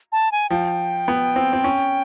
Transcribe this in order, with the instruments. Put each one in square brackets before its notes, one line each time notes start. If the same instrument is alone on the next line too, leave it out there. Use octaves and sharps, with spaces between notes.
[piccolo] A5
G#5
[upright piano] F3 [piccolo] G5
[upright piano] B3
C4
C4
C#4